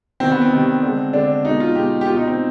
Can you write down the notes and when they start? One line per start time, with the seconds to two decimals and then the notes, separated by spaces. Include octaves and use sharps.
0.20 C3 D#3 G3 C4
0.31 B3
0.42 C4
0.52 C3 D#3 G3
0.82 D3
0.88 G#3
1.13 D3 G#3 D4
1.45 B2 G#3 D#4
1.60 F4
1.76 B2 G#3 G4
2.01 G4
2.07 B2 G3 F4
2.17 D#4
2.27 C4